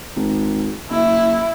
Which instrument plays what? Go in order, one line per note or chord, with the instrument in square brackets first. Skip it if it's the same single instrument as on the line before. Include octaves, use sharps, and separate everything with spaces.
[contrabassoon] G#1
[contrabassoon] F#1 [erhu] E4